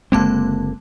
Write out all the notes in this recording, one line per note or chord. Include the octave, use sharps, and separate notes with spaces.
F#1 D3 G#3 A#3 C4 A5